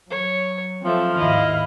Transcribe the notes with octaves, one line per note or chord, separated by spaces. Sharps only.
F#3 C#5
F3 A3 C4 E5
D#2 G#2 E4 D#5 F5 B5